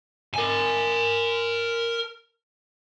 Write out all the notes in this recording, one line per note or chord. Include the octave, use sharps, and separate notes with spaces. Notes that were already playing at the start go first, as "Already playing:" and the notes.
A#4 G#5